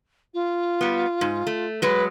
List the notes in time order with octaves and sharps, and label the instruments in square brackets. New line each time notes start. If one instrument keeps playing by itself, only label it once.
[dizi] F4
[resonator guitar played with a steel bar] G3 B3
G#2
A3
[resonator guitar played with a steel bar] F#3 G#3 [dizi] B4